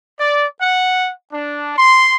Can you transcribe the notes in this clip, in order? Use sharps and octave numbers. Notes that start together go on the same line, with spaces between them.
D5
F#5
D4
C6